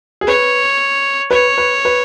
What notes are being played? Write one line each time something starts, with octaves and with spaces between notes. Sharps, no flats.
G#4
B4 C#5
B4 C#5
B4
B4